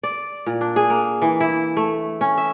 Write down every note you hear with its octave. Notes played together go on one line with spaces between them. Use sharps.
D5
A#2
D4
G#4
A#3
E3
E4
A3
C#4
E5